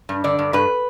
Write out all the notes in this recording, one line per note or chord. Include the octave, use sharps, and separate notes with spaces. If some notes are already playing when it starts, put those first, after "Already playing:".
G2
D3 D5
G2
G2 B4